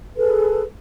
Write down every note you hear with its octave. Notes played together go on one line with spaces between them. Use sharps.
G#4 A4 B4